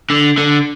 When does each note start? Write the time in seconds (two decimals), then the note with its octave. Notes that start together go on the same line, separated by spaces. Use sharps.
0.10 D3
0.38 D3